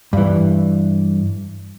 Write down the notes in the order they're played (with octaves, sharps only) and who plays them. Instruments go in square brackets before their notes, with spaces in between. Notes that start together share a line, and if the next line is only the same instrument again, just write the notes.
[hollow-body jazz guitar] G2 E3